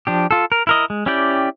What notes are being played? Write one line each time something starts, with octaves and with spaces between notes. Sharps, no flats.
F3 D4 G4
F4 A4
A#4
E4 A#4 D#5
G#3
C#4 E4 G4 D5 G5